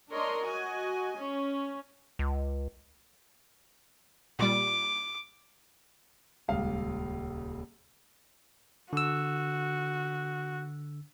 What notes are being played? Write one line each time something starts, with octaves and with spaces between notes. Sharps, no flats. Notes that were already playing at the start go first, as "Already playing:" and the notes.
D4 A#4 C#5 D#5 C6
F#4 D#5 G#5
C#4
C#2
A#2 G3 D6
D#1 C#2 F5
D3 F#4 E6